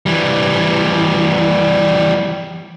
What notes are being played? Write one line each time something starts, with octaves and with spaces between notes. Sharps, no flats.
E3 G3